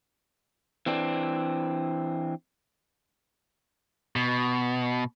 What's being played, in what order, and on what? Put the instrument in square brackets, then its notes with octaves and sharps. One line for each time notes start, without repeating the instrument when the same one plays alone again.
[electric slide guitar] E3 C4 D4
[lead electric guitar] B2